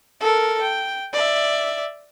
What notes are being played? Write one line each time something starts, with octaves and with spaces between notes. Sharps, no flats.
A4 A#4
G5
D5 E5